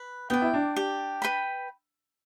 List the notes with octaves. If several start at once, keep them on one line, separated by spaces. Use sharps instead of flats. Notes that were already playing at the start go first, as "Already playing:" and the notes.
Already playing: B4
B3 D5 G5
E4
D4
G4
B4 G5 B5